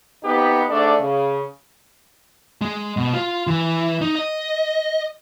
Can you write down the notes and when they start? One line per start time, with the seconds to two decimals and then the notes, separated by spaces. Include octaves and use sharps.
0.24 F2 B3 D#4 G4
0.69 G#2 A3 D4 D5
1.01 C#3
2.61 G#3
2.97 B2
3.14 F4
3.47 E3
4.01 D#4
4.15 D#5